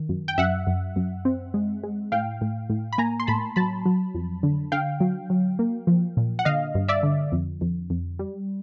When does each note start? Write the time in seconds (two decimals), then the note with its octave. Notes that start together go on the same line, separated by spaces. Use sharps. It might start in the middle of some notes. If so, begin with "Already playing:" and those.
Already playing: D#3
0.09 F#2
0.28 G5
0.38 F#2 E5 F#5
0.67 F#2
0.96 F#2
1.25 C4
1.54 G#3
1.83 G#3
2.12 A2 F5 G5
2.41 A2
2.70 A2
2.93 B5
2.98 A#3 G#5 A#5
3.20 C6
3.27 A2 A5 B5
3.56 F#3 A5 B5
3.86 F#3
4.15 F2
4.43 D3
4.72 D3 F5 G5
5.00 F#3
5.30 F#3
5.59 A#3
5.87 F3
6.17 A#2
6.39 F#5
6.45 D3 D#5 F5
6.75 G2
6.88 D5 E5
7.03 D3
7.32 F2
7.61 F2
7.90 F2
8.19 G3